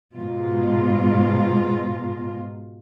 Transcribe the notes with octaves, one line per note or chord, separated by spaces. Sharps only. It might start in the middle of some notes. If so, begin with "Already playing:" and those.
G#2 B2 F4